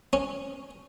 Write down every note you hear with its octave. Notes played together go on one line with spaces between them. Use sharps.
C#4